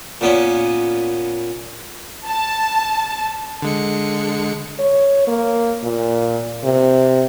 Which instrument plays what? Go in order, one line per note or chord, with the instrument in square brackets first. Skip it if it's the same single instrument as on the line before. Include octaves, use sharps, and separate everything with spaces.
[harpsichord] A#2 B3 C#4
[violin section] A5
[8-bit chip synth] D3 G#3 C#7
[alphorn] C#5
A#3
A#2
C3